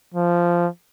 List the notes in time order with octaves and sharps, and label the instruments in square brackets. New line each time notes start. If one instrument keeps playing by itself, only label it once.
[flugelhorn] F3